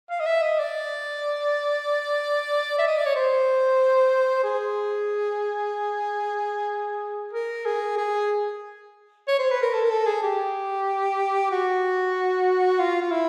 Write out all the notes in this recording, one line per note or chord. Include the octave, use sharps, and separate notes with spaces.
F5
D#5
E5
D#5
D5
E5
D#5
D5
C#5
C5
G#4
A#4
G#4
G#4
C#5
C5
B4
A#4
A4
A#4
A4
G#4
G4
F#4
F4
F4
E4